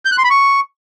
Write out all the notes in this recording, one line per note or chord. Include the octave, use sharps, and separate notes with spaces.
G6
F#6
C6
B5
C#6